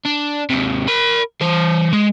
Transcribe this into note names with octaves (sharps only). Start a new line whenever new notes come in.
D4
D#2 C3
A#4 B5
E3 C5
G#3